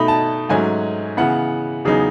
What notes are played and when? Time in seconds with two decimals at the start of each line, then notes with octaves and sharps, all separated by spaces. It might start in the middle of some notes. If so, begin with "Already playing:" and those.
Already playing: B2 A3 D#4 B5
0.08 A5
0.49 G#2 F#3 A3 C#4 G#5
1.17 C#3 E3 B3 F#5
1.85 E2 C#3 F#3 B3 D#4 G#4